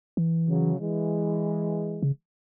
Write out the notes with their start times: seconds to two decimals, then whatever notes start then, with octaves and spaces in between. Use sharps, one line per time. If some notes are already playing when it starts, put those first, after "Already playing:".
0.17 E3
0.48 C#3 F#3
0.79 E3 G#3
2.02 C#3